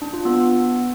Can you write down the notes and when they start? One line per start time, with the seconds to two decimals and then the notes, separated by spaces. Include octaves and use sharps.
0.02 D4
0.13 F4
0.25 B3